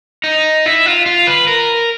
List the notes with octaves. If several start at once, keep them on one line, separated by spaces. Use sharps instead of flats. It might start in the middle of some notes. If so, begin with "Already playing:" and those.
D#4
E4
F4
F4
B4
A#4